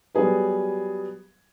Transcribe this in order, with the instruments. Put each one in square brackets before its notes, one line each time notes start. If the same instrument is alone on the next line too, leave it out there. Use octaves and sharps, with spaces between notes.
[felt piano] F#3 G3 B3 G#4 B4